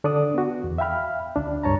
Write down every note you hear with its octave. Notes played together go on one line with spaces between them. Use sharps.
D3 D4 A4 D5 D6 D#6
B3 F#4
E2
E5 F5 G5 B5 F6
D2 D4
C#2 G2 C#5 A5 A#5